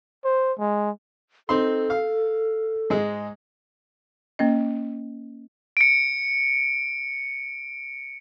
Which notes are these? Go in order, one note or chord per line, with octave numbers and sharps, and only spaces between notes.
C5
G#3
C4 D#4 A4 C6
F5
G#2 G#3
A#3 C#4 D#5
C#7 D7